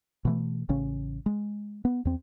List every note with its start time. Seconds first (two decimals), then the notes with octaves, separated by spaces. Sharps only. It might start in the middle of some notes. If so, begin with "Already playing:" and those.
0.25 B2 E3 A3
0.69 A1 C#3 C#4
1.26 G#3
1.85 B3
2.05 E2 C4